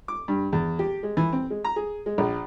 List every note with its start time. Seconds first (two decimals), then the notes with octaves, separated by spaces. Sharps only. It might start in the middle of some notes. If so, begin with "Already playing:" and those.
0.08 D6
0.28 G2
0.53 E2
0.79 G4
1.03 G#3
1.17 E3
1.33 C4
1.50 G#3
1.65 A#5
1.76 G#4
2.06 G#3
2.18 A#1